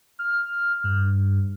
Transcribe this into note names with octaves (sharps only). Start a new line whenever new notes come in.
F6
G2